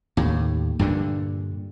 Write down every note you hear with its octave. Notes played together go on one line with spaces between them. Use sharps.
D#2 A2
G2 A#2 D3